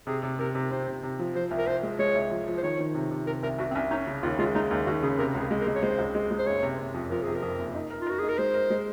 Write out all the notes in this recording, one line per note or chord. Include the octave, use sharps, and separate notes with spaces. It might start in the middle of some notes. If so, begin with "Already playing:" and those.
C3 G#4
C3
C3 A#4
C3
C3 C5
C3
C3
F3
F3 C5
C2
A#4
C2 C5
G#3
G#3 C#5
C2
F3
F3
C5
D#3 C#5
D#3
C3
C3
C3 A#4
C2 A#4
C2 F#4
C4
C2 C#4
C#4 D#4
C#3
D#2 F4
G#3 F4
G#3 D#4
D#2 D#4
D#2 F#4
C#3 G#4
C3 A#4
C#2 G#4
G#3
A#4
G#3
C#5
G#3 C5
C#2
G#3
G#3
C5
F#1 C#5
C3
C3
F2
F3 A#4
C3 G#4
A#4
F2
F#1
D#4
A#4
F4
F#4 A#4
D#4 G#4
A#4
G#3 C5
A#4
G#3